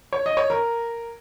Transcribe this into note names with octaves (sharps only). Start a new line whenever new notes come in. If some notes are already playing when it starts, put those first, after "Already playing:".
C#5
D#5
C#5
A#4